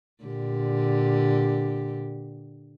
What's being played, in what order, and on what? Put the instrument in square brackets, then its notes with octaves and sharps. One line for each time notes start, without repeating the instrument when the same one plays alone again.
[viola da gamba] A#2 D3 G4